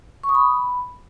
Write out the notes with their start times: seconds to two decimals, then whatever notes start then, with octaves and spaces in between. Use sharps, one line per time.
0.23 C#6
0.29 D#6
0.35 B5